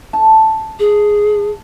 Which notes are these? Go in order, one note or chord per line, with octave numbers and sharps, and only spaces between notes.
A5
G#4